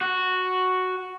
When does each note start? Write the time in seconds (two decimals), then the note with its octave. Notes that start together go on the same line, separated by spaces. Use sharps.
0.01 F#4